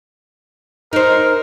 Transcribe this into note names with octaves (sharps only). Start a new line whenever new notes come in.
D#4 A#4 C5